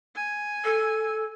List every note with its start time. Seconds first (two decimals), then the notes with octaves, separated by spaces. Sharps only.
0.16 G#5
0.65 A4